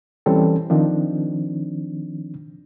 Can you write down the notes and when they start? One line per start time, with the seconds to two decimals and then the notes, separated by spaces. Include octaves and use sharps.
0.26 E3 G3 C4 C#4 A4
0.70 D#3 F3 C4 D4